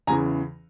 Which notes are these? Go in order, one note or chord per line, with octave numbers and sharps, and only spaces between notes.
E2 C#3 E3 G#5 A#5